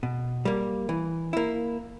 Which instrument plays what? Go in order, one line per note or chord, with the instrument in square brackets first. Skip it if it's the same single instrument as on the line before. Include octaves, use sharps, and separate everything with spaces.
[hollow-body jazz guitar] B2
G3 A#3
E3
A#3 E4